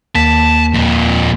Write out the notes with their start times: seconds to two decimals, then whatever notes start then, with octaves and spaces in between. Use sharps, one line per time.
0.15 D#2 A#3 A5 B6
0.74 F2 A#2